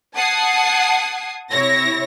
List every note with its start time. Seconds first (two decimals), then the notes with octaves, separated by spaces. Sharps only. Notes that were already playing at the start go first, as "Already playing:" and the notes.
0.16 F#5 A5 D#6 G#6 C7
1.52 C3 E4 C#5 A#6